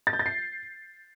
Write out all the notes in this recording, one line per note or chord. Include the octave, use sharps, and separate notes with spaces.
A6
G6
A6
C7